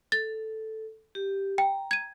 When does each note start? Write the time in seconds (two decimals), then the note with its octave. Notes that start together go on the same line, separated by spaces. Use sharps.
0.12 A4 A6
1.15 G4
1.58 G5 A#5
1.91 G#6 D#7